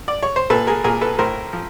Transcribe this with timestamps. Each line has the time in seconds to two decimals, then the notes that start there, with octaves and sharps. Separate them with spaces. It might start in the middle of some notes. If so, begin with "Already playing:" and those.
0.08 D5
0.23 C#5
0.36 C5
0.50 A#2 A4 B4
0.67 G#4 A#4
0.84 A#2 G#4 A#4
1.01 A4 B4
1.19 A2 A#4 C5
1.53 F3